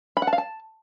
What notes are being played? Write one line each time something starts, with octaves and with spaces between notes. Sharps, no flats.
B5
F#5
A5
F5
A5